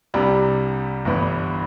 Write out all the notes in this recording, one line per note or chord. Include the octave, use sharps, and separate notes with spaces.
C2 C3 G3 D4
G1 G2 E3 B3